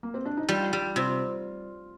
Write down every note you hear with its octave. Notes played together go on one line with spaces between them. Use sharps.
A#3
C4
D4
D#4
G3 F4
G3
C3 F4